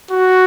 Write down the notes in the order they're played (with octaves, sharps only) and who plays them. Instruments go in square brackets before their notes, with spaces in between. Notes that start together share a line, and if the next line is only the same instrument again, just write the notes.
[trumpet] F#4